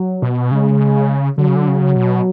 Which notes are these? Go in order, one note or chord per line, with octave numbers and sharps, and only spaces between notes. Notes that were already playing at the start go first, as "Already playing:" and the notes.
Already playing: F#3
B2
C#3 G#3
D3 F#3
C#3
D3
C#3
B2